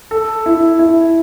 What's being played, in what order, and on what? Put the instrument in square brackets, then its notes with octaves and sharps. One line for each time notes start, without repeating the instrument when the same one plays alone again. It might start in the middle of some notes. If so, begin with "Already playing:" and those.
[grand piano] A4
E4
E4